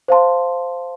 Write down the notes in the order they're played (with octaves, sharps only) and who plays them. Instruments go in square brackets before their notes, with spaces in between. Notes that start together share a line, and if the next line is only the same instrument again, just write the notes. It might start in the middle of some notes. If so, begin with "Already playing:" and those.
[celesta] C5 F5 A5 C6